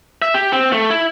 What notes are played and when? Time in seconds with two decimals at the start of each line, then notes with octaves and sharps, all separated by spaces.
0.22 E5
0.34 G4
0.53 C4
0.73 A3
0.90 E4